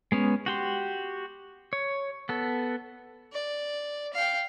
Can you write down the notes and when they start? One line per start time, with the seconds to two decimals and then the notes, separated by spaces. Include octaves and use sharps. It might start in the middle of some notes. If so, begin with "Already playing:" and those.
0.12 G#3 B3 C#4
0.46 F#4 G4 C6
1.73 C#5
2.29 B3 A4
3.32 D5
4.13 F5 G5